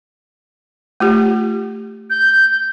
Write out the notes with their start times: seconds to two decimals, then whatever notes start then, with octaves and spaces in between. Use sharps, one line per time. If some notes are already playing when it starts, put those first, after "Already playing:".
1.00 A3 F4 G4
2.10 G6